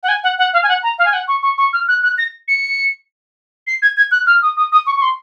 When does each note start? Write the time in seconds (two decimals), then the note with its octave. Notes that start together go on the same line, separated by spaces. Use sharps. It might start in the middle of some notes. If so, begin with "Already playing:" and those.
0.03 F#5
0.08 G#5
0.23 F#5
0.38 F#5
0.53 F5
0.63 G#5
0.69 F#5
0.83 A#5
0.99 F5
1.05 G#5
1.13 F#5
1.28 C#6
1.43 C#6
1.58 C#6
1.73 F6
1.88 F#6
2.03 F#6
2.18 A#6
2.48 C#7
3.67 C7
3.82 G#6
3.97 G#6
4.11 F#6
4.27 F6
4.42 D#6
4.57 D#6
4.72 D#6
4.86 C#6
4.97 C#6
5.02 C6